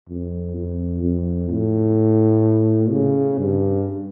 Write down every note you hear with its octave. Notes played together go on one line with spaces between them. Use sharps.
F2
F2
F2
A2
C#3
G2